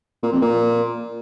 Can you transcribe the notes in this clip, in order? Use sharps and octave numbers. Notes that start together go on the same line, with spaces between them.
A#2
F2
A#2